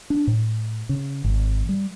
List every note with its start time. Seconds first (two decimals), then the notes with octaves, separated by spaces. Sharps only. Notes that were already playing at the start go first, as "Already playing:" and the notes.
0.10 D4
0.27 A2
0.89 C#3
1.24 G#1
1.69 G3